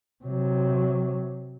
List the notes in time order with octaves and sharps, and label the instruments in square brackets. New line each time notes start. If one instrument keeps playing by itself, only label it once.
[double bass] C3 F#3